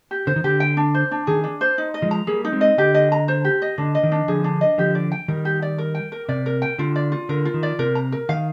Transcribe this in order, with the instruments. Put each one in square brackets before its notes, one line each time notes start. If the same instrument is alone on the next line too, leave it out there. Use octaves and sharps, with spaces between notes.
[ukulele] G4
[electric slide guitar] D3 [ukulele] C5
[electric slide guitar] D#3
[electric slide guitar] D3 [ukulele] G4
[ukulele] G5
D4
C5
D4
[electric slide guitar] D#3 [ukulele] G#4
[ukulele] D4
C5
D#4
D#5
[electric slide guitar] F3 G#3
[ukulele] A#5
[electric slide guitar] G3 A#3 [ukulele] G#4
[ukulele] D#4
[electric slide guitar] G#3 C4
[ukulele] D#5
[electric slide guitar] D3 [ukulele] G4
[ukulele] D#5
A#5
C5
G4
D#5
[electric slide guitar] D3 [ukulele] D4
[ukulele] D#5
[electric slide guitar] D#3
[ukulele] D4
[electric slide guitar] D3 F3 [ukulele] G#4
[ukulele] D4
D#5
[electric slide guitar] D3 F3 [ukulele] G4
[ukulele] D5
G5
[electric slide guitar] D#3 G3 [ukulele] A#4
[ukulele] G4
D5
A#4
G5
A#4
[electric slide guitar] C3 [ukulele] D5
[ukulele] A#4
G5
[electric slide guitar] D3 [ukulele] F4
[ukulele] D5
F4
[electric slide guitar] D3 [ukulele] A#4
[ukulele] F4
[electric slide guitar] D#3
[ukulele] D5
[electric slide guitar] C3 [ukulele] A#4
[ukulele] A#5
A#4
[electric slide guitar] D#3 [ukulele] F5